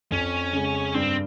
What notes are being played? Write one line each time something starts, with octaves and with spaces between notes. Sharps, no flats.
F2 C#4
C#3 G#3
G2 C4